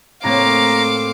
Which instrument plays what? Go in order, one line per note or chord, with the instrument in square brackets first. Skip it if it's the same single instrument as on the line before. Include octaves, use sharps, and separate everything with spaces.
[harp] A2 A#3 [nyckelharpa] C4 [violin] F5 D6 [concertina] A#5